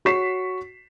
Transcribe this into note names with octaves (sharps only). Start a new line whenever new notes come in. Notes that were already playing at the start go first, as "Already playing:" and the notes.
F#4 C#5 C#6 B6 C7 E7